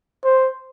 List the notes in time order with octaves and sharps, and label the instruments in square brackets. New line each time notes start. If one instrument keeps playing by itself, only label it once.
[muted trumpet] C5